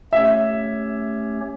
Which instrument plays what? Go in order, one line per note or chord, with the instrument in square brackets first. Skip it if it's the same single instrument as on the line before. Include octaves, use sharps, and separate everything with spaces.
[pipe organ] A3 C#4 G4 C#5 [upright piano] E5